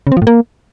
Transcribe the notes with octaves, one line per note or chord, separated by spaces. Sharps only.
C#3
C4
F3
A2
A#3